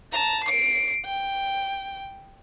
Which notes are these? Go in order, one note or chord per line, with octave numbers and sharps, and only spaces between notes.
A5 A#5
C7 D7
G5